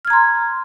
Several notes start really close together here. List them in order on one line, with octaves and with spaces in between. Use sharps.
F6 G#6 A#5 C6